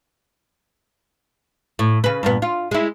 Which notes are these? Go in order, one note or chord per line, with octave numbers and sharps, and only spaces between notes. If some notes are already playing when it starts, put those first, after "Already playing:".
A2
C#3 B4
G2 A#2 B3
F4
G#3 E4